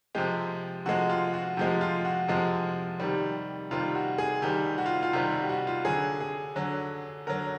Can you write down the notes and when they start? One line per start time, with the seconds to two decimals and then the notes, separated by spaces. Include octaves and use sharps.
0.15 C3 F3 G#3 G4
0.86 C3 F3 G#3 F#4
1.09 F4
1.33 F#4
1.57 C3 F3 G#3 G4
1.81 F4
2.05 F#4
2.28 C3 F3 G#3
3.00 C3 D#3 G3
3.71 C3 D#3 G3 F4
3.95 F#4
4.18 G#4
4.42 C3 D#3 G3 G4
4.78 F#4
4.86 F4
5.03 F4
5.13 C3 D#3 G3 G4
5.31 F#4
5.49 F#4
5.67 F4
5.85 D3 F#3 G#4
6.20 G#4
6.56 D3 F#3
7.27 D3 F#3 A#4